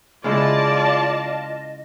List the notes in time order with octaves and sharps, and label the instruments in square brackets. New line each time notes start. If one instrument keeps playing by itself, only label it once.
[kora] C#3 G#3 E4 [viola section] F4 A5 [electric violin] D5 [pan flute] D#5